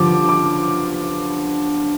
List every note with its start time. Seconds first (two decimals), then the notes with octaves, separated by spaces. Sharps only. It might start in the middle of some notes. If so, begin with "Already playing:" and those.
Already playing: G2 D3 F3 D6
0.29 D6